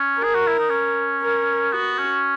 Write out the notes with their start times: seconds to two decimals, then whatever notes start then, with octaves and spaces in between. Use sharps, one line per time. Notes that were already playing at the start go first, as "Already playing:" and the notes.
Already playing: C#4
0.19 G#4 A#4
0.35 F#4
0.47 E4
0.59 D#4
0.69 C#4
1.22 A#4
1.73 B3 F#4
1.98 C#4